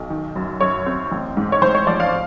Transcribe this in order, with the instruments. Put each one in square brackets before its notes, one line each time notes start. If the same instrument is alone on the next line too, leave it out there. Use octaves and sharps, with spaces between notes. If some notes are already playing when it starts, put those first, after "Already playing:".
Already playing: [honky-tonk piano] B1
D#3
F#2
F#2 C#5
C4
A1
G#2
C#5
A1 C5
C#5
F3 D5
F5